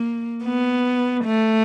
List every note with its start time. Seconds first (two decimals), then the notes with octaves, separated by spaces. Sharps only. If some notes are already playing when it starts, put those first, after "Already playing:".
Already playing: A#3
0.45 B3
1.25 A3